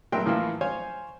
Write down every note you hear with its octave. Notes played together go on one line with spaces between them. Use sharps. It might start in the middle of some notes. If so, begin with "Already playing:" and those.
A#1 F#3 A#4 E5 G5 C6
A2 E3 F3 A#3 E4 C6
C5 C#5 F5 G#5